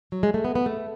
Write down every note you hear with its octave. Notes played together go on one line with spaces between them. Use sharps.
F#3
G#3
A3
B3
B3
A3